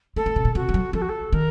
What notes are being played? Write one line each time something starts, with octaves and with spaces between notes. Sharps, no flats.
A3 A4
A3
C3
A#2
C3 F#4
F3
F#3
F3 A4
F#4
A4
D#3 A#4